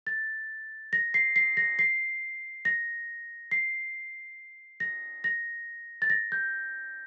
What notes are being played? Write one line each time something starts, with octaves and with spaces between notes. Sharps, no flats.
A6
A#6
C7
C7
A#6
C7
A#6
C7
A#6
A#6
A6
A#6
G6